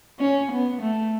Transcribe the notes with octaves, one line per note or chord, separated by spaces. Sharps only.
C#4
B3
A3